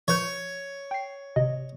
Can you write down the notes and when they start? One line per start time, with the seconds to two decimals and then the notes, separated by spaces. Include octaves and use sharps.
0.08 F3 B4 C#5 G6
0.91 G5 C7
1.36 G#1 C3 D#5